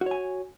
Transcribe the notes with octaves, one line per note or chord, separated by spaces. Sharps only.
F#4 C#5 G#5